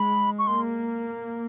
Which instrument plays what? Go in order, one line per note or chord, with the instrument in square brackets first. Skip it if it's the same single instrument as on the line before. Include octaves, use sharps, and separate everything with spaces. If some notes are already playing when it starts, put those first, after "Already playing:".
Already playing: [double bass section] G#3 [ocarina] B5
[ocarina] C#6
[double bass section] A#3 [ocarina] C6